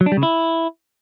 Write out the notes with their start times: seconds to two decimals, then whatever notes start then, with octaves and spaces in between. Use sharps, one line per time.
0.01 F#3
0.06 D4
0.12 G3
0.17 C#3
0.23 E4